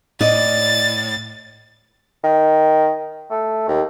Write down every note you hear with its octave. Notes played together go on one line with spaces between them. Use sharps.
A2 D5 D#5 A6
D#3
A3
D#2